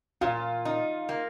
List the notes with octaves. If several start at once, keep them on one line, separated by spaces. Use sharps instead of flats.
A#2 F4
D#4
A#3